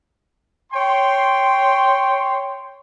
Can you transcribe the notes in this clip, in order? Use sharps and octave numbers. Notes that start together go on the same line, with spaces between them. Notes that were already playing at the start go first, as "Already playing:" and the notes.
C#5 G5 C6